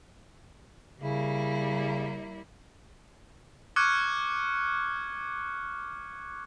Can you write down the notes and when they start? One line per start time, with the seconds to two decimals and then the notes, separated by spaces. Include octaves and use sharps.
1.01 C#3 G3 A#3 E4
3.76 C#6 D6 F6 F#6 G#6 C#7